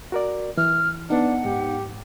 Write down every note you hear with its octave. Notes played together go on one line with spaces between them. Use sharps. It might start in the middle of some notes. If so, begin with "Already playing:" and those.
F#4 A#4 D5
E3 F6
B3 D4 D#4 F#5
G#2 G4